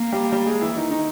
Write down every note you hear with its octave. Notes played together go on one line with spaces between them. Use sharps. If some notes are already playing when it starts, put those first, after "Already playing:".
Already playing: A#3
G3 G4
G3 G4
G#3 G#4
E3 E4
D#3 D#4
D#3 D#4